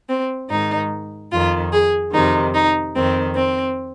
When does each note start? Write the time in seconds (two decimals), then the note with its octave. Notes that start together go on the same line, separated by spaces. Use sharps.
0.09 C4
0.49 G#2 D#3 D#4
1.31 F2 D#3 F4
1.73 G#4
2.13 F2 C3 D#3 D#4
2.54 D#4
2.95 F2 D#3 C4
3.36 C4